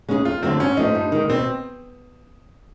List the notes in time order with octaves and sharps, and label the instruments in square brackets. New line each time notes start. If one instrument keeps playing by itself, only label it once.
[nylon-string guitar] G#3 C#4 E4 G#4
[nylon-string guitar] F2 [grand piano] F4
[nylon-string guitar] D3 F#3 A3 [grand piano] C4
[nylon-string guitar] G#2 [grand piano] C#4
[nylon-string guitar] F3 A3 C4 [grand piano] D#4
[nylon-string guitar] G2
D#3 G#3
[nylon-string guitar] B2 [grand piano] C4